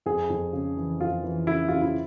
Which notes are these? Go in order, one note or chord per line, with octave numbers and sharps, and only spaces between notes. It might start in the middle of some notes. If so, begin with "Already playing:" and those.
F2 G#4
F2
C#3
E3
F2 F4
E3
C#3 E4
C#3 F4
E4